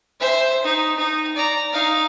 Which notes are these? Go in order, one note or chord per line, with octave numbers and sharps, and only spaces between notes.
C5 E5
D#4
D#4
D5 A#5
D#4 F5